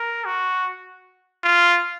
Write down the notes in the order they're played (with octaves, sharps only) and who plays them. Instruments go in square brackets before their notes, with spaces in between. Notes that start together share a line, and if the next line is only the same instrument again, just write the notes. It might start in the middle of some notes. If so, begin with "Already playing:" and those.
Already playing: [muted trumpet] A#4
F#4
F4